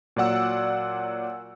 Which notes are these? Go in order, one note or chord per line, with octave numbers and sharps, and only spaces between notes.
A#2 F#3 D5 F#5 E6